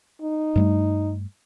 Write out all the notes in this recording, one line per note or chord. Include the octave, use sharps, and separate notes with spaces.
D#4
G2 G3 A3